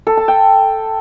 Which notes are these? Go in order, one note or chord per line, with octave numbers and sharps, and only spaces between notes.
A4
A5
G5